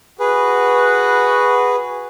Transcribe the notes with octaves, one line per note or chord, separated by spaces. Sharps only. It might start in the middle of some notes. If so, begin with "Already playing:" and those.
F#4 G#4 B4